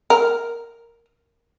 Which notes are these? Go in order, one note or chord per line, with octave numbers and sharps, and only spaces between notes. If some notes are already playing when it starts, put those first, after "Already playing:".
A#4